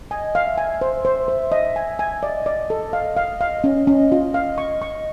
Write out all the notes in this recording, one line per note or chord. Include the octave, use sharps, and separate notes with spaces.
D#5 G#5
F5
E5
G#5
C5
C5
C5
D#5
G#5
G#5
D5 D#5
D5
A4
F5
F5
F5
C#4
C#4
F4
F5
C#6
C#6